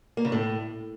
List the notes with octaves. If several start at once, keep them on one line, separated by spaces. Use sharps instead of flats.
A#3
C#3
A2